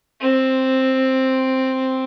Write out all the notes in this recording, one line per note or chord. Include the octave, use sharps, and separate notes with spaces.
C4